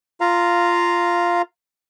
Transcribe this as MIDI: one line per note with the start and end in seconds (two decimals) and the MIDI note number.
0.21 1.42 65
0.21 1.42 77
0.21 1.42 82